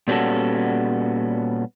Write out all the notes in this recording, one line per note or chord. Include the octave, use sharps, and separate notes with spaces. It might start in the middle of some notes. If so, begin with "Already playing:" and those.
A#2 G3 B3 C#4 F#4 A4